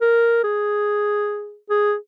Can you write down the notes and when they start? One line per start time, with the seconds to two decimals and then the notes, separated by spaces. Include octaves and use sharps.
0.01 A#4
0.44 G#4
1.70 G#4